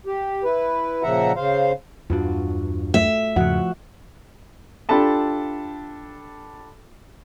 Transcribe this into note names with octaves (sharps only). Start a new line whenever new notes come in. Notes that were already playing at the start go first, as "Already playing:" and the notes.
G4
E4 B4
A#2 C#3 F3 E5 F#5 A#5
C#3 C5 F5
E2 G2 D4 F4 F#4
A3 E5
E2 G#2 C#3 F3 F#4 F#5
D4 F4 G4 A4 A5 B5